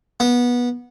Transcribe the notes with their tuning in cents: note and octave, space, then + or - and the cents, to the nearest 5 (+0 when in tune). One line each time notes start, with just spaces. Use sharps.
B3 -20